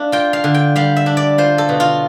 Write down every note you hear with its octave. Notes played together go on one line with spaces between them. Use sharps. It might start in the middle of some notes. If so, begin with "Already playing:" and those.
Already playing: A3 D4 F5
F4 G5
F5
D3
G5
G3 F5
E5
D4
D5
F4 C5
A4
B2
F4